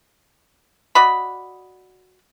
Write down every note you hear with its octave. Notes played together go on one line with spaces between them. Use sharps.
F#4 D5 D#5 B5